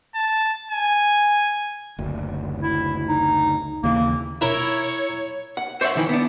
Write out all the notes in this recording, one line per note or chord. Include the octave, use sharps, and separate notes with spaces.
A5
G#5
F#1 D2
E4
D#4
D#2 C#3 E3 A#3
E4 A#4 C#5
F#5
C5 C#5 D#5 E5 F#5
B1 D#3 E3
B3 D4